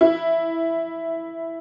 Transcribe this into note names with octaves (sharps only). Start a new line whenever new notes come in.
E4